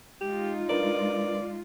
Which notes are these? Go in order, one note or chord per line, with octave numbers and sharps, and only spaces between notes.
G#3 D#4 F4 G4
D4 A#4 B4 D5